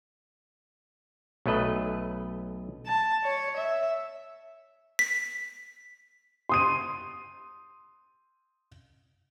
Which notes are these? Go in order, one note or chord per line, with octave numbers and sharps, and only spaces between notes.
B1 F#3 A3 B4 D#5
A5
C#5
E5
B6
C6 D#6 D#7